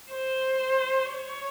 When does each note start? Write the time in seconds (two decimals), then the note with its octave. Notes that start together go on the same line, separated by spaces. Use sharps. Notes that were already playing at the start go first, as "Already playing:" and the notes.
0.12 C5
1.14 C#5